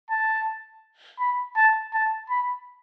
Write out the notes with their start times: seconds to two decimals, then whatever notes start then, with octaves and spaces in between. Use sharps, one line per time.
0.11 A5
1.20 B5
1.56 A5
1.94 A5
2.30 B5